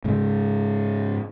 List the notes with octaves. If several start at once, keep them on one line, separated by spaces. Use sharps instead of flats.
G#2 C#3 G#3